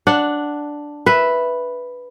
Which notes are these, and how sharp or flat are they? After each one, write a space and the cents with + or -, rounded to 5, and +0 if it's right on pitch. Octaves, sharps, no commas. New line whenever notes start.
D4 +0 F#5 +0
B4 +0 E5 +0